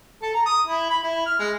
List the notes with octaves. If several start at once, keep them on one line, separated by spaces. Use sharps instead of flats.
A4
A#5
D#6
E4
B5
E4
F6
G#3